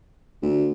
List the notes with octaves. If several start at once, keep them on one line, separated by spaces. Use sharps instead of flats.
D2